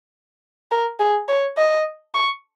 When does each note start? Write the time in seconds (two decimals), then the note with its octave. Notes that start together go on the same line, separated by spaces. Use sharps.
0.71 A#4
1.00 G#4
1.28 C#5
1.58 D#5
2.14 C#6